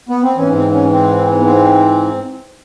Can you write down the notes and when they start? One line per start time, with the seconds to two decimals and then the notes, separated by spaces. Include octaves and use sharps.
0.09 B3
0.23 C4
0.36 G#2 E3 C#4
0.55 C4
0.72 C#4
0.90 C4
1.39 B3
1.44 C4